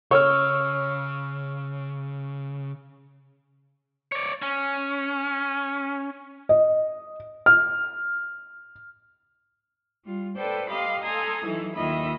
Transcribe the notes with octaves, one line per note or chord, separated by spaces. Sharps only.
C#3 C#5 C#6 E6 F6
C#5 D5
C#4
D#5
F6
G3 F4
A4 B4 C5 D5 G5
G4 D#5 F5 B5 C6 D6
A4 G#5 A#5 C6 D#6
E3 F#3 D#4 E4 A4
D#2 D#3 F4 D#5 E5 B5